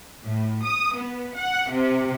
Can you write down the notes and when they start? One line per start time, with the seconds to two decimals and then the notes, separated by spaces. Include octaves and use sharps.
0.25 A2
0.65 D#6
0.96 B3
1.37 F#5
1.71 C3